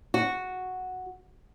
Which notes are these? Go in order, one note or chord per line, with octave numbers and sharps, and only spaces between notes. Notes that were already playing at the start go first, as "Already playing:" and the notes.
F#4